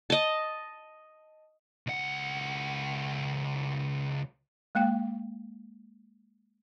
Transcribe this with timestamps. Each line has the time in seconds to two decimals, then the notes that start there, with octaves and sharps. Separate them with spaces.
0.10 D#5 A5
1.87 C#2 F#5
4.75 G#3 A#3 F5 G5